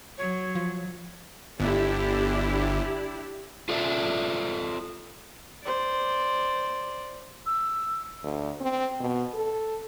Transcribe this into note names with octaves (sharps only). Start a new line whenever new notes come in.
F#3 C#5
F3
G1 D4 E4 G4
F4 A4 D5 E5
C5 D5
E6
D2
C4
B2
A4